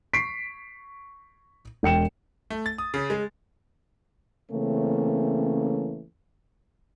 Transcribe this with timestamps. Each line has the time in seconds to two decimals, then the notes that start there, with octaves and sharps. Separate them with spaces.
0.13 C#6 B6 C7 D7
1.83 E1 G5 C#7 E7
2.50 A3
2.66 A6
2.78 D#6
2.94 C#3
3.10 G#3
4.51 C#3 E3 A3 A#3 C4 C#4